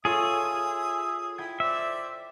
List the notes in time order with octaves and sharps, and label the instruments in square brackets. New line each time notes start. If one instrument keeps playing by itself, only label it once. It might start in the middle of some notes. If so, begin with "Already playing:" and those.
[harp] F4 A4 C#5 [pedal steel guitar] G#4 [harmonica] E5 D#6
[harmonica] E4 [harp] G5 G#6
[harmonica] C5 D5 [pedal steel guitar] E5